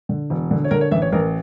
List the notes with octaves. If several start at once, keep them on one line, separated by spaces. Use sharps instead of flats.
D3
E1
D3
C#5
D3 A#4
C#5
A1 E5
C#5
A1 A#4